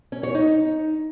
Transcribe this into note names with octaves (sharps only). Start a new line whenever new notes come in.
C#4
C#5
D#4